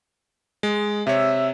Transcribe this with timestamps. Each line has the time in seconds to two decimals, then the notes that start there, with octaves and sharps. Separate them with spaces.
0.63 G#3
1.07 C3 C#5 E5